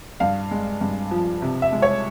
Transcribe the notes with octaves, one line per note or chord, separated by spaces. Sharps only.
G2 F5
G#3
G2
F3
C3
E5
G#3
C#5